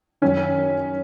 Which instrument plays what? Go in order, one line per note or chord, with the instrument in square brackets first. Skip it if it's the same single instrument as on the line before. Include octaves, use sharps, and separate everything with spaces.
[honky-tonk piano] F#2 D#3 C#4